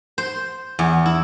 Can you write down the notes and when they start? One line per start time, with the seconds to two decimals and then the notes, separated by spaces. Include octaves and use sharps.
0.18 C5
0.79 E2
1.06 E4